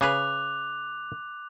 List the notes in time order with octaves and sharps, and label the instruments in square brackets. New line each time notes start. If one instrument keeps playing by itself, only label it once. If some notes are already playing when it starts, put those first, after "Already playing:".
[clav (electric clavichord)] C#3 G#4 B4 [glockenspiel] D6 F#6 F7